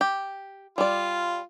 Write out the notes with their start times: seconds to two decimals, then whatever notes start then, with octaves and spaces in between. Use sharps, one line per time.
0.01 G4
0.78 G3 F4 D5